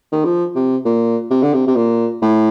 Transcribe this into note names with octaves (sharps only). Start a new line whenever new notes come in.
D#3
F3
C3
A#2
C3
D3
C3
C3
A#2
A2